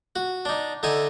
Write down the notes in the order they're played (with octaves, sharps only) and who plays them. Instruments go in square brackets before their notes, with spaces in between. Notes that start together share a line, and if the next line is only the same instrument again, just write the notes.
[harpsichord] F#4
D4 D#4
D3 D#4 E5 G#5